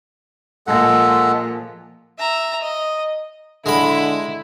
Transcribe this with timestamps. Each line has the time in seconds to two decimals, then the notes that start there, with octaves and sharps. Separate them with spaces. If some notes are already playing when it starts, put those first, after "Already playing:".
0.67 A#2 F3 G#3 A4 F#5
2.19 E5 A#5
2.61 D#5
3.66 D3 G#3 E4 B5